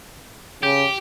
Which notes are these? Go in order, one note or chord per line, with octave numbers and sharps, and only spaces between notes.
C#3 G4